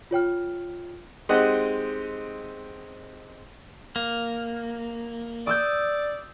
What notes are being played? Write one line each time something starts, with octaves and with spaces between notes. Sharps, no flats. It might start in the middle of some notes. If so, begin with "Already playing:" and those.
F4 C#5 G5 F6
G#3 C4 D#4 G4 D#5 F#5
A#3
D5 D#6 E6 G6